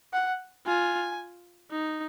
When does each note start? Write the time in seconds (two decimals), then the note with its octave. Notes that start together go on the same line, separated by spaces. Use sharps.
0.13 F#5
0.66 F4 G#5
1.71 D#4